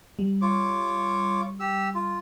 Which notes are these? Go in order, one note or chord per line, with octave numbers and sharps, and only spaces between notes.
G3
F4 C#5 D6
G4 E6
F4